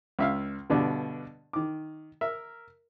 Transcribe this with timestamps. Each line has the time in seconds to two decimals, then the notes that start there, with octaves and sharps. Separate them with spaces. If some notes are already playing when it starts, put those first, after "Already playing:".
0.19 C#2 E5 F5
0.70 G2 B2 D3 D4
1.53 D#3 D6
2.21 A#4 E5